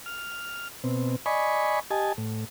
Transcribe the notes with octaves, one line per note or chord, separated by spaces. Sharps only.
F6
B2 C4
D5 D#5 G#5 B5 C#6
G4 D#5 G#5 A5
A2